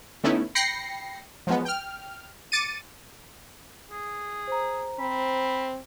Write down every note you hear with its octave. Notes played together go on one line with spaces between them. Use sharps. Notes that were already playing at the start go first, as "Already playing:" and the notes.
D3 A3 B3 C#4 D#4 E4
G5 B5 A#6 C7 C#7
F3 F#3 G#3 B3
G5 F6
D6 A6 C#7 D#7
G#4
C5 A#5
C4 B5